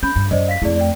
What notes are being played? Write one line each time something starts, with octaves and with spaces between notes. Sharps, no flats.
C#4 B5 G6
G2
F#2 C5 D5 D#5
F5 B6
F2 A3 E4 G#4 D5
D5 G5